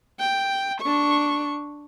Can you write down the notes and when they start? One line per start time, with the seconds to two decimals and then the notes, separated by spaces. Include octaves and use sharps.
0.20 G5
0.82 D4 C#6